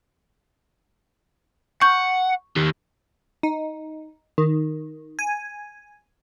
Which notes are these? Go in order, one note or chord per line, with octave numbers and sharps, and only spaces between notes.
F#5 C#6 G6
D#3 G4
D#4
D#3
G#5